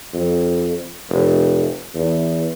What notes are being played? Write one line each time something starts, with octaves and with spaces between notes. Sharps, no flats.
F2
F1
E2